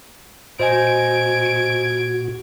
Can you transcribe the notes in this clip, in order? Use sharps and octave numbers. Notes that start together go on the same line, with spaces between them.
A#2 F#4 C5 D#5 G#5 G#6 D7